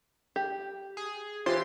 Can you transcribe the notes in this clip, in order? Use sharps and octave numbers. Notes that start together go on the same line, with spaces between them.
G4
G#4
E3 F4 G4 C5 C6